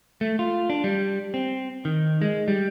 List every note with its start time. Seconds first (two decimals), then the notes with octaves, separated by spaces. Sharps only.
0.21 A3
0.39 F4
0.70 D4
0.84 G3
1.34 C4
1.85 D#3
2.22 G#3
2.48 G3